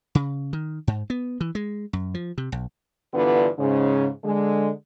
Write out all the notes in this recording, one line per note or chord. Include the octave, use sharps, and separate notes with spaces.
C#3
D#3
G#2
B3
E3
G#3
F#2
F3
C3
B1
G2 D3 E3 B3 F4 B4
G#2 C#3
D3 G#3